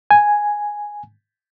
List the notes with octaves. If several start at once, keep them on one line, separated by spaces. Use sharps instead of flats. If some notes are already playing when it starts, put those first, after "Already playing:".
G#5